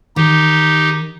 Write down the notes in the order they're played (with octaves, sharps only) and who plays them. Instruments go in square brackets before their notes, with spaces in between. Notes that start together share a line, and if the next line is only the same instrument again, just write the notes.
[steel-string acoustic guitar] D#3 [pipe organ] D#4 G4